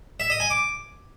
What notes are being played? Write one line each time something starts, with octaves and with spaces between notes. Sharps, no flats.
E5
D#5
G#5
D6